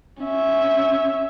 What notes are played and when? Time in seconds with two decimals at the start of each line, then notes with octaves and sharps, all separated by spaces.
0.22 C#4 E5